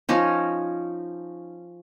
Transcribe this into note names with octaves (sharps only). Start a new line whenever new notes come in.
F3 C#4 D#4